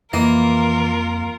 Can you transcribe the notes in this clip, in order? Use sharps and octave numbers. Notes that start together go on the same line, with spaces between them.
F2 E3 A#3 F4 A#4 D#5